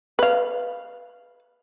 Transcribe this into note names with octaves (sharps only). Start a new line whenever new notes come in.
B4 F5